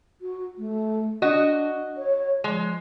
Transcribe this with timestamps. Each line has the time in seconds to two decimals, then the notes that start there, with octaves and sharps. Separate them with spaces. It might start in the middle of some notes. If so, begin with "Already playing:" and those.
0.21 F#4
0.58 A3
1.22 D4 F#4 D#5
1.97 C#5
2.44 F3 G#3